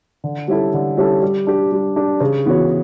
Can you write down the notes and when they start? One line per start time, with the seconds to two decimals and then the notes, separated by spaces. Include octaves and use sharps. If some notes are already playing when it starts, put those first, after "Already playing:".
0.24 D3
0.48 G3 C#4 E4 A4
0.74 D3
0.97 G3 C#4 E4 A4
1.23 G3
1.47 D4 G4
1.72 G3
1.96 D4 G4
2.20 C#3
2.46 E3 B3 F#4 C#5